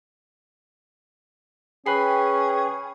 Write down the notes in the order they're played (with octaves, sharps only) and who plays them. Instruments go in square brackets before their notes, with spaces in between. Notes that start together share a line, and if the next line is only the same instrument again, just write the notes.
[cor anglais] C#4 [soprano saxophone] G#4 [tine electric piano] B4 B5 C7 [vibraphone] G5